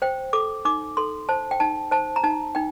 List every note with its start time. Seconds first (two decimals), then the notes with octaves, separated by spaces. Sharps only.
0.02 C5 G5
0.33 A4 D6
0.65 D#4 D6
0.97 A4 C6
1.29 C5 A5
1.51 G5
1.60 D#4 A5
1.91 C5 A5
2.16 A#5
2.24 D#4 A5
2.55 D#4 G5